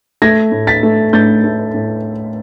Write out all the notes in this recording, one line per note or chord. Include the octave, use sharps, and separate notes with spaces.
A3 G#6 A#6
A2
A6 B6
A3
A2 G6 A6
A3
A2